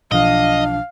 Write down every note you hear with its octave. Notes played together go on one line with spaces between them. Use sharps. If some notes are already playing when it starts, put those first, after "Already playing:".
B1 F3 D4 D#5 F5